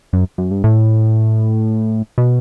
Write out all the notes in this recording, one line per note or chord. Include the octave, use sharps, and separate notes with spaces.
F#2
F#2
G2
A2
B2